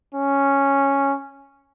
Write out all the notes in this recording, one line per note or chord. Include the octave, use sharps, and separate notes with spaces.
C#4